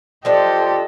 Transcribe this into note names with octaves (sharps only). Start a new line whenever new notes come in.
F3 D4 G4 A4 C5 D#5